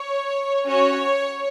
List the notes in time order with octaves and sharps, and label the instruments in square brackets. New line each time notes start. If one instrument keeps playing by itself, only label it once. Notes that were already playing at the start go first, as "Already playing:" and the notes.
Already playing: [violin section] C#5
C#4 F#4 C#5